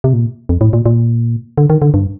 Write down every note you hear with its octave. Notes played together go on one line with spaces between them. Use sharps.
C3
A#2
F2
A2
A#2
A#2
D3
D#3
D3
G2